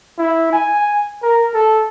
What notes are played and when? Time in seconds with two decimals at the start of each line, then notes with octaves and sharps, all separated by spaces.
0.18 E4
0.53 G#5
1.22 A#4
1.54 A4